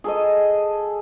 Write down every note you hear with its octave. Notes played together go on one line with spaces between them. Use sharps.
G#4 A4 D#5